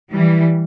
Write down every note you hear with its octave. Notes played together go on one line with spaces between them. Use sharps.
E3 G3